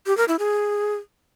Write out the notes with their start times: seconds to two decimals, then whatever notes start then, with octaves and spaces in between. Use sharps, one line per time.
0.07 G4
0.17 A#4
0.28 E4
0.39 G#4